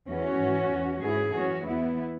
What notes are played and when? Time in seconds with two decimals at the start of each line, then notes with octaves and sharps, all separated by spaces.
0.09 E2 E3 C#4 F#4
0.41 G#2 E3
0.71 E2 E3
1.02 G#2 E3 E4 G#4
1.33 F#2 E3 C#4 F#4
1.65 E2 E3 B3 E4